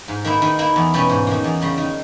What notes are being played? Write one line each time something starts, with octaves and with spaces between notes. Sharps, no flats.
G#2
D#3 A#3 E4
D#3
A#3 E4
E2
B2 G3 C#4
G#2
D#3 A#3
E2
C#3 G3
D#3